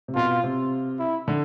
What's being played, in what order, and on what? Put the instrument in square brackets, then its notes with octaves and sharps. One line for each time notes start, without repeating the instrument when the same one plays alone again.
[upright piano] C3
[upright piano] B2 [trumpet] F4
[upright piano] C3
[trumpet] E4
[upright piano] D3